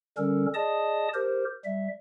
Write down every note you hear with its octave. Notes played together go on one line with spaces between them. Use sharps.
D3 G3 C#4 A4 A#4
G#4 D5 D#5 A5 D#6
G4 A#4 C5
G3 E5